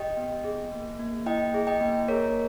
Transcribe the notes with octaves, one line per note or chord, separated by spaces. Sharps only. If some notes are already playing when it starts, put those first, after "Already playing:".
Already playing: G4 D#5 G5
B3
G#4
A#3
A#3
E4 D#5 G5
G#4
D#5 G5
A#3
G#4 A#4 C#5